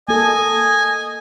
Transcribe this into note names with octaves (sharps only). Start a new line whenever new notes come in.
A#3 A4 D#5 G#5